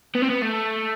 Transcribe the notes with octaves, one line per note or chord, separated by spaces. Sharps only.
B3
C4
B3
A3